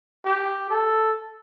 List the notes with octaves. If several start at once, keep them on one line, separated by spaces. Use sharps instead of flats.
G4
A4